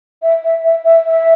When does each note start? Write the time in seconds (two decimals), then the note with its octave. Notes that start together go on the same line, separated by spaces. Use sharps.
0.23 E5
0.44 E5
0.65 E5
0.85 E5
1.07 E5